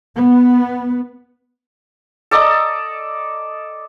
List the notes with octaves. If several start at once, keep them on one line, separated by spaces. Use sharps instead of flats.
B3
A4 D5 D#5 A#5